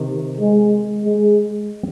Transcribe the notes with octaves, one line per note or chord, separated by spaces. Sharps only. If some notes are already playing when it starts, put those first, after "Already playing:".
Already playing: C3 D#3
G#3
G#3